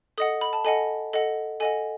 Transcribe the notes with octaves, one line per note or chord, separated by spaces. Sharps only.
A4 D#5 F#5 D#6
B5
A5
A4 D#5 F#5 G#5
A4 D#5 F#5
A4 D#5 F#5 G#5